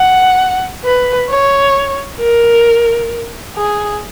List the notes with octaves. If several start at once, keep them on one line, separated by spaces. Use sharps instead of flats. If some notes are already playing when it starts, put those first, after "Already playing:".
Already playing: F#5
B4
C#5
A#4
G#4